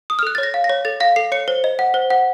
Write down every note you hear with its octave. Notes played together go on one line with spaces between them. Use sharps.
D#6
F6
A4 F#6
A6
C#5
A#6
F5
A#6
C#5
A4 A6
F5 A#6
A4 C7
C#5 C#7
C5
D#5
F#5
C5
F#5